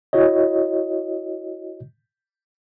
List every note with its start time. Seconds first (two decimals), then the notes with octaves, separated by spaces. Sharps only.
0.13 E4 F#4 C#5 D#5